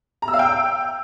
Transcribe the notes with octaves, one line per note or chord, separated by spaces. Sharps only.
A#5
E6
F5
G5